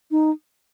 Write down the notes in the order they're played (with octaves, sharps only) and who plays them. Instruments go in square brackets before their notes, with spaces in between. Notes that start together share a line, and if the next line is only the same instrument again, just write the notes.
[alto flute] D#4